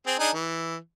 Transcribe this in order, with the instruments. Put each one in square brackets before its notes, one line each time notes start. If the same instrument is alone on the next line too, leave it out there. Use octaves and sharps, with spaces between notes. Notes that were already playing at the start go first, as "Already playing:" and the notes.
[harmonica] C4 G#4
D4 D#4 G#4
E3